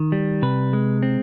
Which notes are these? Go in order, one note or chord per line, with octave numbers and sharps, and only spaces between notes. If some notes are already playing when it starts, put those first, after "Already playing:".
Already playing: D#3
G3
C3 B4
G#3
C4